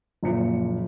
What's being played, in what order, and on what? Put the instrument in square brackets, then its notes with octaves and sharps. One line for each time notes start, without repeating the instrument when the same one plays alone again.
[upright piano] F#1 A#2 F3 C#7